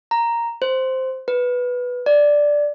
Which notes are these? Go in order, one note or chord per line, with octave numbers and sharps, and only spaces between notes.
A#5
C5
B4
D5